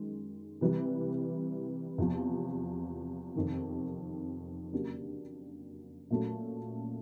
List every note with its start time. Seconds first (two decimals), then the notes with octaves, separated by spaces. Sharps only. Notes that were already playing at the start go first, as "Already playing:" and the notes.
Already playing: F#2 D#3 G#3
0.61 C3 E3 G3
1.98 E2 C3 F3
3.36 F2 C3 D#3
4.72 C#3 F#3 A#3 D4 G4
6.10 A#2 F#3 A3 C#4